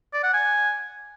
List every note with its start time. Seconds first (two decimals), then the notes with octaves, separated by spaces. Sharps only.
0.14 D5
0.23 F#5
0.33 G#5